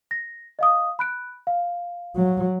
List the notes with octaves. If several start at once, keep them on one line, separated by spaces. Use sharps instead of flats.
A#6
D#5 F5 D#6
B5 F#6 D7
F5
F#3